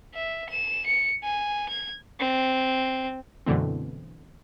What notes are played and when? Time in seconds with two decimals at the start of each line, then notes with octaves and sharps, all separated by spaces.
0.14 E5
0.49 E7
0.86 C#7
1.23 G#5
1.69 G#6
2.20 C4
3.46 F#2 B2 D3 E3 A3 C4